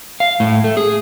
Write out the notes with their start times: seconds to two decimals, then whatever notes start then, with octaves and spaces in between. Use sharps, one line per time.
0.20 F5
0.40 A2
0.64 A3
0.77 G#4